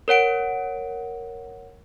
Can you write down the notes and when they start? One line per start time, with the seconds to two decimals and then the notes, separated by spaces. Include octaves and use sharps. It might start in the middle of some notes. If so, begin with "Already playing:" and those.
0.08 A#4 C#5 F#5 D7